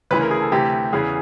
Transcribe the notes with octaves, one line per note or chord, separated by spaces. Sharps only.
D2 C#3 E3 B4
A#4
G#4
A4
D2 C3 E3 G4
E2 C#3 E3 G#4